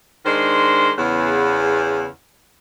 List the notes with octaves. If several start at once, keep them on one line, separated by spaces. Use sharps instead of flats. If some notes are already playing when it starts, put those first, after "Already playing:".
D#3 G#3 D4 C5
E2 C#3